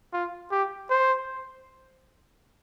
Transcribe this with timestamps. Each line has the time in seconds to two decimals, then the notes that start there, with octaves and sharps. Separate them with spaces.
0.13 F4
0.52 G4
0.90 C5